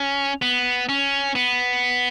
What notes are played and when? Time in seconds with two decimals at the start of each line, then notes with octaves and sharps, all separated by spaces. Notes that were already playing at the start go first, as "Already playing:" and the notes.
Already playing: C#4
0.42 B3
0.89 C#4
1.35 B3